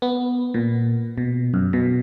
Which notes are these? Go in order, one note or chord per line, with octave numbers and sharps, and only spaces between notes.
B3
A#2
B2
F#2
B2